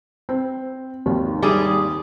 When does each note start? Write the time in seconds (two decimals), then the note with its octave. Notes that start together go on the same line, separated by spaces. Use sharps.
0.29 C4
1.06 G#1 D#2 D#3
1.42 G3 G#4